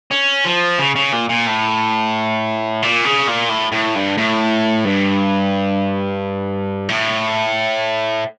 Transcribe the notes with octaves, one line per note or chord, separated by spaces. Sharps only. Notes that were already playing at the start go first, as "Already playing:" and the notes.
C#4
F3
C#3
C#3
A#2
A#2
A2
A#2
C#3
A#2
A2
A2
G2
A2
G2
A2